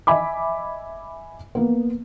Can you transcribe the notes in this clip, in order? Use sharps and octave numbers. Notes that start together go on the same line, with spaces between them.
D#5 E5 G#5 B5 D6
A#3 B3